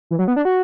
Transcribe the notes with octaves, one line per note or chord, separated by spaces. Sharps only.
E3
F#3
B3
D4
F#4